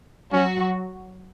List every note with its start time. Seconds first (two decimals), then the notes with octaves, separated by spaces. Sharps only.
0.32 F#3 C#4 F#4